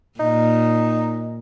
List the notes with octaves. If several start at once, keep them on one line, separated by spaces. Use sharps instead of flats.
A#2 D#4